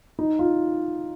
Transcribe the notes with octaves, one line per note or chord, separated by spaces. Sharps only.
D#4
F4